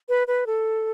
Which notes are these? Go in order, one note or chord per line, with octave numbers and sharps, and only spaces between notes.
B4
B4
A4